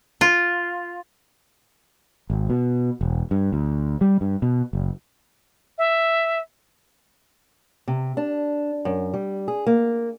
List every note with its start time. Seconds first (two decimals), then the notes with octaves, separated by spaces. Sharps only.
0.21 F4
2.30 G#1
2.50 B2
3.01 E1
3.31 G2
3.52 D2
4.01 G3
4.21 G2
4.42 B2
4.73 F#1
5.78 E5
7.88 C3
8.17 D4
8.85 F#2
9.14 G3
9.48 G#4
9.67 A#3